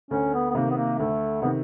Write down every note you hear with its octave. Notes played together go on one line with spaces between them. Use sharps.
D2 C#4
B3
B3
C3 D#3 A#3
B3
A#3
D2 A3
C3 D#3 B3